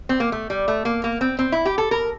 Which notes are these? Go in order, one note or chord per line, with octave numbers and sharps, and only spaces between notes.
C4
A#3
A3
G3
A3
A#3
A#3
C4
C4
E4
G4
A4
A#4